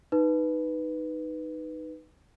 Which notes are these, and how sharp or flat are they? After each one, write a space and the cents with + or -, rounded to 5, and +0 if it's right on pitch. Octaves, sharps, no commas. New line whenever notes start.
D#4 +0 B4 +0